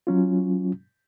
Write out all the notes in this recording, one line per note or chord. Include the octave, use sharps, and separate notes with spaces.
F#3 C#4 F4